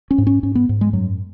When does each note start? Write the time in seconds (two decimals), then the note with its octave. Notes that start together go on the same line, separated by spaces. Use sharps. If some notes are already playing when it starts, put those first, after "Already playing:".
0.11 C#4
0.18 G#2
0.27 C#4
0.43 G#2 C#4
0.55 B3
0.69 G#2
0.81 G#3
0.93 F#2 F#3